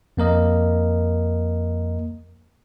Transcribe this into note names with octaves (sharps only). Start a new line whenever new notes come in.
F2 A#3 A#4 D#5